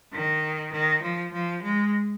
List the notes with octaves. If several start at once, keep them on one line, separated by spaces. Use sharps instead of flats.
D#3
D#3
F3
F3
G#3